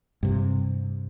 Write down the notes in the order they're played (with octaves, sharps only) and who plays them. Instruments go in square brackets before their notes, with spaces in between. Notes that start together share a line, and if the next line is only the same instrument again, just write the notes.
[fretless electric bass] G2 C3